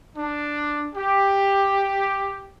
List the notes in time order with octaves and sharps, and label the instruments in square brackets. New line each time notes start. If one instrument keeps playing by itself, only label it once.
[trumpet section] D4
G4